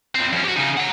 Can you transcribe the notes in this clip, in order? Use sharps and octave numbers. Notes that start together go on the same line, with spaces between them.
E2 C4
F2 C#4
F#4 G4
C#3 D#4
F#5 A#5